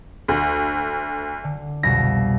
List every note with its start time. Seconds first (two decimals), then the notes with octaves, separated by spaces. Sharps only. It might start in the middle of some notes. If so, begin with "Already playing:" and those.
0.28 D2
1.44 D3
1.83 C2 F2 B2 A#6